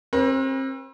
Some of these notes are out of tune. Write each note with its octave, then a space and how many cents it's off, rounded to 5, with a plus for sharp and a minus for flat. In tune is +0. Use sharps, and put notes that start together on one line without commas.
C4 +35 G4 +45 B4 -40